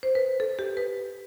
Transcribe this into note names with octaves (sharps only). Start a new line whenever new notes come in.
C5
B4
A4
G4
B4